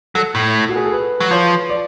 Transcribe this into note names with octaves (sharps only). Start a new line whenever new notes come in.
F#3 A4
A2
F#4
G#4
A4
B4
F#3
F3 C#5
D5